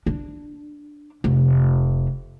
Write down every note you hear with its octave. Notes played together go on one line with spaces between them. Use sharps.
D4
F1